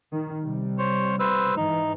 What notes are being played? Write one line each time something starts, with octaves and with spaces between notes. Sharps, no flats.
D#3
C3 G3
C5 C#5
B4 C5 E6
G#2 E3 D#4